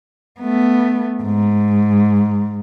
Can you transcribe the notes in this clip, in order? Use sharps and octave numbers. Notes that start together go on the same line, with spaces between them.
A3 B3
G#2